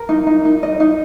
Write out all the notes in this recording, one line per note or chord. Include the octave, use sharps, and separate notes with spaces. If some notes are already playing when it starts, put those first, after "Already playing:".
Already playing: A#4
D#4
D#4
D#4
D#5
D#4